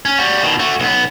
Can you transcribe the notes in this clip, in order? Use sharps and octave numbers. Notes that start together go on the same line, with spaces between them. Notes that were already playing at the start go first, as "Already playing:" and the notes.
C#4
G3 F#4
B2 D#3
A3 F#4
B1 B3